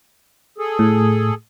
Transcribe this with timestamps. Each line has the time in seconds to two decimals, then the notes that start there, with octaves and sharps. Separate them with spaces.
0.58 G#4 A4
0.79 A2